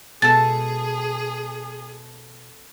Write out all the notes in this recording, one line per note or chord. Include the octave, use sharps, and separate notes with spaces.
B2 G#3 G#4 A4 A5 A6